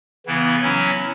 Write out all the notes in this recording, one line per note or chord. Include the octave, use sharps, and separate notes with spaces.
C#3 E3 B3 E4
F#3 C#4 E4